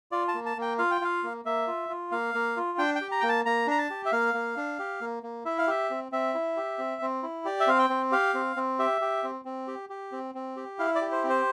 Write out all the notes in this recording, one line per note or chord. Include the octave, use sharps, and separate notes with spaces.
F4 D5
A5
A#3
A5
A#3 G5
F4 F5
G5
F4 F5
A#3
A#3 E5
F4
F4
A#3 F5
A#3
F4
D4 G5
G5
G4
A#5
A#3 G5
A5
A#3 A#5
D4 A#5
A5
G4
E5
A#3 F5
A#3
D4
G4
A#3
A#3
E4 E5
F5
G4 E5
C4
C4 E5
E4
G4
C4
C4
E4
G4 D5
E5
C4 F5
G5
C4
G4 F5
C4
C4
G4 E5
G4
C4
C4
G4
G4
C4
C4
G4
E4 F5
D5
G4
C5
C4
C5